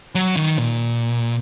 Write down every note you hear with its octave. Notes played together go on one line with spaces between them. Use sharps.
F#3
D#3
A#2